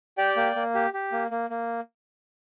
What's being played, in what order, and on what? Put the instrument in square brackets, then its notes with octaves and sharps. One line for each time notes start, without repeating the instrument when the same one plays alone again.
[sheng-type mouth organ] G4 D5 G5
A#3
A#3
G4
G4
A#3
A#3
A#3